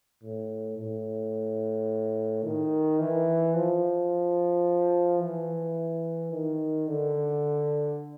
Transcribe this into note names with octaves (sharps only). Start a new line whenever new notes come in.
A2
A2
D#3
E3
F3
E3
D#3
D3